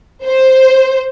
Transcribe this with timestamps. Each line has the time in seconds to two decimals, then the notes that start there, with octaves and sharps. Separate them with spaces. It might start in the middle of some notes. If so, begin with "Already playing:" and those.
0.25 C5